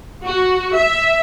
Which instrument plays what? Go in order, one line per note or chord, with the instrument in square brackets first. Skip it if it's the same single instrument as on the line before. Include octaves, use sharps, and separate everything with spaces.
[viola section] F#4
E5